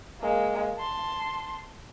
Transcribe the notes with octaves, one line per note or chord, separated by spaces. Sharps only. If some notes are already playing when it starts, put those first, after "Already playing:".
G#3 A#3
A5 C6